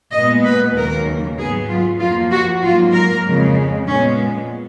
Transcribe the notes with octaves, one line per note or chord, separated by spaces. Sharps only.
A#2 G#3 B3 D#5
B4
D#2 C#3 F#3 A#3 A#4
G#2 F#3 B3 G#4
F4
F2 F3 A#3 F4
F#4
G#2 F#3 A#3 F4
A#4
F2 C#3 G#3
A#2 G#3 B3 C#4